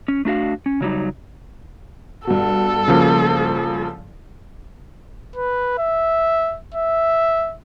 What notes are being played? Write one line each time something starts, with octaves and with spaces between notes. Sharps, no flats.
C#4
A3 D4 F#4 F5
C#4
C#3 F#3 G3 D#4
G2 B2 A4
C#3 F3 A#3
B4
E5
E5